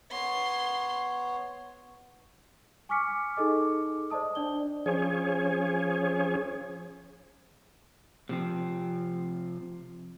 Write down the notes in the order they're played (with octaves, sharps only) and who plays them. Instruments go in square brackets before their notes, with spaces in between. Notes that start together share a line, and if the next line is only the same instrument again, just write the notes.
[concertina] B3 C#5 [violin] C6
[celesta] G#5 C#6 D6 F6 B6 C#7
D#4 G#4 A4 D#5 D6
C5 D5 D#5 A5 D#6
D4 D5 G7
[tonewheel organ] F3 C#4 G#4 C#5
[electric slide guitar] C3 F3 C4